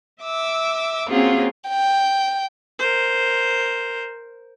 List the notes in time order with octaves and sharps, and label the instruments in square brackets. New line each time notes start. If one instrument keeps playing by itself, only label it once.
[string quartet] E5 D6 E6
A#3 C4 C#4 F4 F#4 G#4
[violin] G5
[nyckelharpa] A#4 C5